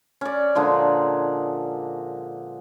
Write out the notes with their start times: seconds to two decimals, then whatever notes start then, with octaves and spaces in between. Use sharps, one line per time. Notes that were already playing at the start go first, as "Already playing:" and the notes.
0.21 C#4 D5
0.55 A#2 D3 F3 G#3